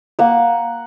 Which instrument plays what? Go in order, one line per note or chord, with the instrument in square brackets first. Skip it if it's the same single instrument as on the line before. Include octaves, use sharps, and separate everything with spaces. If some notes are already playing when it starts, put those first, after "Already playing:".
[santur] A#3 F#5